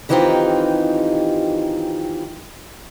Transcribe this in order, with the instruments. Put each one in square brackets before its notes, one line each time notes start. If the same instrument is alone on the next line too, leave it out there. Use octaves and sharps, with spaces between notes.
[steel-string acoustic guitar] D#3 E3 C4 D#4 F4 G4